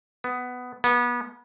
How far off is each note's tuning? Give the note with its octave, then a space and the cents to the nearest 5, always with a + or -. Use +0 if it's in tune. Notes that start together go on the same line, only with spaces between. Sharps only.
B3 +10
B3 -30